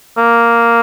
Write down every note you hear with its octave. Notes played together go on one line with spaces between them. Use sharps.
A#3